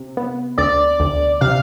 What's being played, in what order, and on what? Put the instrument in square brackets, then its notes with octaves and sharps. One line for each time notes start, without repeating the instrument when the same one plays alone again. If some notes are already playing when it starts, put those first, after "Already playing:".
Already playing: [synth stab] C3
B3
[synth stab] D2 [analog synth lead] D5
[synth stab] D2
[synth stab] C3 [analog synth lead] F5